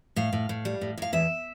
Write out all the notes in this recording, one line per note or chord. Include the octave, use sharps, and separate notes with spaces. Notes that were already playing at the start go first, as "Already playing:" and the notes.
A2 F5
A2
A2
G3
A2
A2 F5
E2 E5